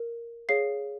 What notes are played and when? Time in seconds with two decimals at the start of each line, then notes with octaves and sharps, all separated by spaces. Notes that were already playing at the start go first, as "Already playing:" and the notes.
Already playing: A#4
0.49 G#4 C#5 F5 C7